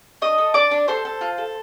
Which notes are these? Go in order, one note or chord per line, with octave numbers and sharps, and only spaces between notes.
D4 D#5 D#6
A4
D4 D5 D6
D4
A4 C5 C6
A4
F4
A4